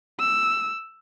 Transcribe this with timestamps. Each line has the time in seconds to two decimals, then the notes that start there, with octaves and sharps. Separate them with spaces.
0.19 E6